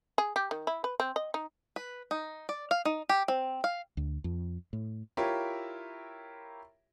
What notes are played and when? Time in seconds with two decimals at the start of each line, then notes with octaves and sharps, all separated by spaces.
0.18 G#4
0.36 G4
0.51 D#3
0.67 E4
0.84 B4
1.00 C4
1.16 D#5
1.34 D#4
1.76 B4
2.11 D#4
2.49 D5
2.71 F5
2.85 D#4
3.09 G4
3.28 C4
3.64 F5
3.97 D2
4.24 F2
4.73 A2
5.17 E4 F4 G4 A#4 C#5 E5